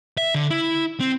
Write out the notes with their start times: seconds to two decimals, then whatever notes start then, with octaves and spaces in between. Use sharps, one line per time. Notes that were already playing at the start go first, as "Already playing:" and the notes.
0.18 E5
0.34 D3
0.50 E4
1.00 C4